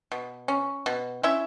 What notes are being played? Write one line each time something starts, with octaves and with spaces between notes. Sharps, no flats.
B2
C#4
B2
C#4 E4 E5